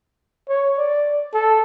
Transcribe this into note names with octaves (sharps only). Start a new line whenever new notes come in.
C#5
D5
A4